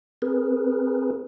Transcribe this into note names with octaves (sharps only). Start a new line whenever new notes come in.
C4 G#4 A#4 B4